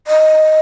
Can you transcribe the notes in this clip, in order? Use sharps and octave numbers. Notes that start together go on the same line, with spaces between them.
D#5